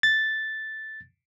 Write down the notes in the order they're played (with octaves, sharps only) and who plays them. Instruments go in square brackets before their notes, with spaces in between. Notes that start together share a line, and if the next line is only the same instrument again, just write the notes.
[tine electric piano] A6